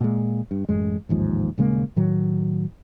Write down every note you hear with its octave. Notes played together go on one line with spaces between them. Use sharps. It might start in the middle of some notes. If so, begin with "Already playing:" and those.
A#2 G#3
G2
A1 F#2 G#3
A1 D#2 G#2 F3
D#1 C#3 G#3 A#3
A2 D#3 F#3